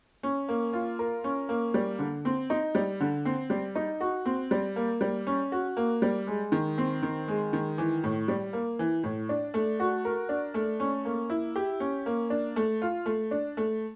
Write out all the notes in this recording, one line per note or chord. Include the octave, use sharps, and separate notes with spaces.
C#4
A#3
F4
A#4
C#4
A#3
G3
D3
C4
D#4
G3
D3
C4
G3
D#4
F#4
C4
G3
A#3
G3
C#4
F#4
A#3
G3
G#3
D#3
C4
D#3
G#3
D#3
E3
A2
G3
A#3
E3
A2
D4
A3
F#4
A#4
D4
A3
C#4
A#3
E4
G4
C#4
A#3
D4
A3
F4
A3
D4
A3